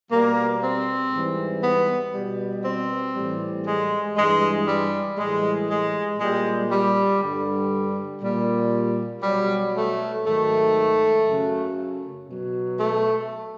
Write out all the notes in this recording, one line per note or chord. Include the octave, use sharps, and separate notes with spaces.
B2 G3 A#3
C4
G#2 E3 G3
B3
B2 G3
C4
A2 E3 G3
G#3
G2 E3 G3 G#3
G3
A2 E3 G3 G#3
G#3
A#2 G3 G#3
G3
G2 D3 G3
A#2 G3
B2 F#3 G3
A3
G#2 D#3 F#3 A3
F#2 C#3 F#3
B2 F#3
A3